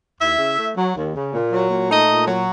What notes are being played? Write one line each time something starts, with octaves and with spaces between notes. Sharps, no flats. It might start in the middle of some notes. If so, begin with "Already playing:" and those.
D#2 E4 E5
C#3
A3
F#3
D#2
C#3
A#2
F#3
A#2
A3 D#4 D#5
A#2
F#3